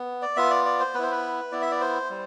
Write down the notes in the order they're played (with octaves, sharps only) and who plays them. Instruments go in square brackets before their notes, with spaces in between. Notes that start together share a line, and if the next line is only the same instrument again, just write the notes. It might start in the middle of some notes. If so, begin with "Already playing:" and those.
Already playing: [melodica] B3
D5
B3 F4 E5
D5
D5
C5
B3 B4
E4 C5
B4
B3 E4 D5
E5
D5
C5
G3